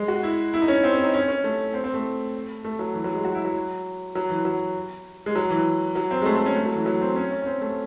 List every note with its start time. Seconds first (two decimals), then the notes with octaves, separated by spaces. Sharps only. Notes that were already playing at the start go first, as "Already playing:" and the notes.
Already playing: G#3
0.08 F#4
0.23 E4
0.54 E4
0.62 D#4
0.68 C#4
0.84 C4
0.93 C#4
1.04 D#4
1.14 C#4
1.28 C#4
1.44 A3
1.74 C4
1.84 C4
1.94 A3
2.64 A3
2.79 F#3
2.94 E3
3.04 F#3
3.15 G#3
3.25 F#4
3.35 E4
3.45 F#3
4.15 F#3
4.30 E3
4.45 F#3
5.26 G#3
5.36 F#3
5.50 E3
5.95 F#3
6.11 C4
6.22 G#3
6.26 A3
6.36 A3
6.46 C#4
6.56 A3
6.66 F#3
6.76 E3
6.86 F#3
7.01 C4
7.16 C#4
7.31 C#4
7.42 C#4
7.46 C4
7.61 A3